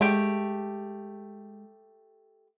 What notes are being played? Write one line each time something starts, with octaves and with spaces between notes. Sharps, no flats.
G#3 A3 G4